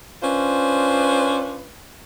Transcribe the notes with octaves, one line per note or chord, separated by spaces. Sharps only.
C#4 D4 F4 B4 C5